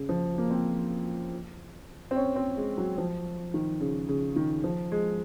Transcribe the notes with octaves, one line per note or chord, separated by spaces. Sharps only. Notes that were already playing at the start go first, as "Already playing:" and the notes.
Already playing: C#3
F3
A#3
C4
C4
C#4
C4
G#3
F#3
F3
D#3
C#3
C#3
D#3
F3
G#3